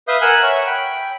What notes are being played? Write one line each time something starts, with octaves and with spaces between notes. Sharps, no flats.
B4 E5 F5 D#6 G6
A#4 F#5 G#5 E6 F#6
C#5 E5 F#5
G5 B5